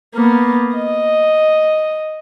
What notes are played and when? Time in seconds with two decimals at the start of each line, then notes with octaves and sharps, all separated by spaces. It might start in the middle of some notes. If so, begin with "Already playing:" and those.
0.15 A#3 B3
0.76 D#5